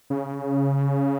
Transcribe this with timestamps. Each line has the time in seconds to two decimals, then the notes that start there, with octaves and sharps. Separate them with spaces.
0.10 C#3